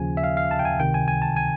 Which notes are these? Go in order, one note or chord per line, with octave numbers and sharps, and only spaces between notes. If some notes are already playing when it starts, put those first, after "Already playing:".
Already playing: D#2 C#3 F3 G#5
E5
F5
F5
A5
G5
G#5
C#2 C3 D#3 G5
G#5
G#5
A5
G#5